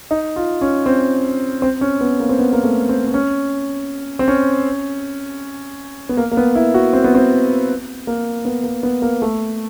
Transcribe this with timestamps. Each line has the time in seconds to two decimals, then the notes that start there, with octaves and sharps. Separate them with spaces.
0.11 D#4
0.36 F4
0.61 C#4
0.86 C4
1.62 C4
1.81 C#4
2.01 B3
2.20 A#3
2.29 C4
2.39 B3
2.53 A#3
2.64 A3
2.89 C4
3.07 C4
3.14 C#4
4.19 C4
4.28 C#4
6.09 B3
6.17 A#3
6.31 A#3
6.37 B3
6.55 E4
6.74 F#4
6.93 C4
7.04 B3
7.15 C4
8.07 A#3
8.45 B3
8.64 A#3
8.83 B3
9.02 A#3
9.22 A3